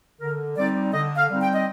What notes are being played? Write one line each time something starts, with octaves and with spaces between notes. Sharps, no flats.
D3 A#4
G3 C4 D#4 D5
D3 D#5
F5
G3 C4 D#4
G5
D#5